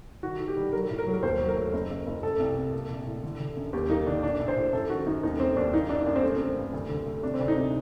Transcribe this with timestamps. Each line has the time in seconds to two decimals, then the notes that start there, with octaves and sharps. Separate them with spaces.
0.23 D#3 F#4
0.40 D#3
0.48 G4
0.57 G3
0.73 F#3 A#4
0.90 A2
0.98 A#4
1.07 F#3
1.13 A#4
1.23 D#2 C5
1.40 F#3
1.48 A#4
1.56 A3
1.73 F#1
1.90 F#1
2.07 F#1
2.23 A3 A4
2.40 C2
2.57 C3
2.73 A#3
2.90 A#1
3.06 A2
3.23 D3
3.40 D3
3.57 F#2
3.73 D#2 G4
3.90 A#3 D#4
4.07 D3 D4
4.23 A#1 D4
4.40 A#1
4.48 C5
4.56 A2
4.73 F#2 A4
4.90 D#3 F#4
5.06 F#2 D#4
5.23 D#2 D#4
5.40 A3 C4
5.56 D#2 D4
5.73 A#3 D#4
5.89 F#2 D4
6.06 F#2 D4
6.16 C4
6.23 A3
6.34 C4
6.39 A3
6.56 G2
6.73 D2
6.89 D3
7.06 A3
7.23 C3 D4
7.34 C4
7.40 D2 D4
7.48 D#4
7.57 C3